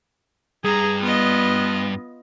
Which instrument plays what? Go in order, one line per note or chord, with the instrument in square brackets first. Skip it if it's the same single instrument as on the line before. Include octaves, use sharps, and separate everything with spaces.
[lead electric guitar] G2 [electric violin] G#4 [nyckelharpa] A#5
[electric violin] B3 [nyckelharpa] F4 D#5